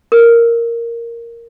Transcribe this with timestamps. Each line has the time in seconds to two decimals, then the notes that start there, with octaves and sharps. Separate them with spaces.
0.12 A#4